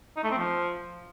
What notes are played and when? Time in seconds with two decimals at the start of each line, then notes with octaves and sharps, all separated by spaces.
0.17 D#4
0.24 A3
0.31 C4
0.38 F3